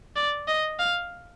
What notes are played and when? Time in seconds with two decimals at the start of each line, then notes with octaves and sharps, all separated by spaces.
0.16 D5
0.48 D#5
0.79 F5